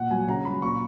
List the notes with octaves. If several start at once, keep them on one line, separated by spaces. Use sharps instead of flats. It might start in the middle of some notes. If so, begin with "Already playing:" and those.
Already playing: A#2 F#5
F#3 G#5
C#3 A#5
F#3 B5
A#2 C#6